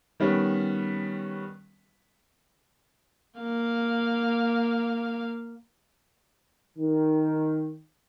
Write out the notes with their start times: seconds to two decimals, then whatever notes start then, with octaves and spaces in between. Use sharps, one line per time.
0.20 D#3 G3 B3 C#4
3.39 A#3 F5
6.78 D#3